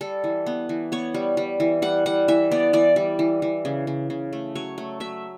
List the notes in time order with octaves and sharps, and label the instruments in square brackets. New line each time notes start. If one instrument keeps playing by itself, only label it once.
[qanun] G3 A4
E3
B3
E3
B3 C#5
G3
G3
E3
G3 F#5
G3 F#5
E3 E5
B3 D5
E3 D5
G3
E3
E3
C#3
C#3
C#3
A3
F#3 C#5
A3
F#3 E5